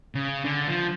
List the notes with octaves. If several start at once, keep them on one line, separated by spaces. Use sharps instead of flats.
C#3
D3
F3